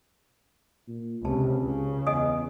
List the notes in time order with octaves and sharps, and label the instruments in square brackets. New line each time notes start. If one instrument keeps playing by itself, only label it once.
[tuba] A#2
[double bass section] C#2 [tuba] C3 [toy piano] A5
[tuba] C#2 [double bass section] C#3
[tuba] E2 [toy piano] D#5 G#5 D#6